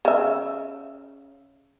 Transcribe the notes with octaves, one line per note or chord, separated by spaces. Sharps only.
C#3 E5